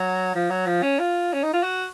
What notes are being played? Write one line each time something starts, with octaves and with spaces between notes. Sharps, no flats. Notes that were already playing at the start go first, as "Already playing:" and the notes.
Already playing: F#3
F3
F#3
F3
C#4
F4
C#4
D#4
F4
F#4